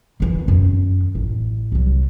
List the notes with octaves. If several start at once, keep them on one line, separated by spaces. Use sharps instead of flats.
D#3 E3
F#2 D#3
A1
C2 F#3